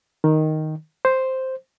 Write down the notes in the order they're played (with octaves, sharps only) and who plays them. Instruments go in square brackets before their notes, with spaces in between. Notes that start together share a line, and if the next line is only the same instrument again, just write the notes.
[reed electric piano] D#3
C5